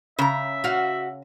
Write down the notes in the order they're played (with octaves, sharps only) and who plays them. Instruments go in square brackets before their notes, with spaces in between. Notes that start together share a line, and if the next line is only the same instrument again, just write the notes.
[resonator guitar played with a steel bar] C#3 A#5 [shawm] E5
[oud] F#4 F5